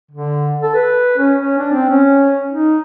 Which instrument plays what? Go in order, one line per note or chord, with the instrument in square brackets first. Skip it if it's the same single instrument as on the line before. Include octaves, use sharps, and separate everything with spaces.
[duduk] D3
A4
B4
C#4
C#4
D4
C4
C#4
D#4